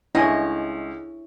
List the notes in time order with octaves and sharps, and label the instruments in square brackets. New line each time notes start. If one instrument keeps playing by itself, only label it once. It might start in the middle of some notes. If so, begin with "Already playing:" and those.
[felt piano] C#2 [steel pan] D4 G#5 [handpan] E4 C#5 [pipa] D#5